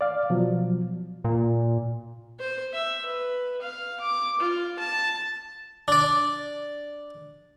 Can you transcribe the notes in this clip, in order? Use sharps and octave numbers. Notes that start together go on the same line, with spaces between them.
D5 F5
B2 F3 F#3
A#2
C5
E5
B4
F5
D6
F4
A5
D4 D5